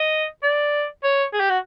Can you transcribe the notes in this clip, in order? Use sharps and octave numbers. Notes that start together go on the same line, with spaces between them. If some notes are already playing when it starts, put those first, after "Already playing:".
Already playing: D#5
D5
C#5
G#4
G4
F#4